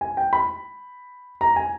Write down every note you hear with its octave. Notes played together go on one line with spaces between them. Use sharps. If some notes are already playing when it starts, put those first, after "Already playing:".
G#5
G5
B5
A#5
G#5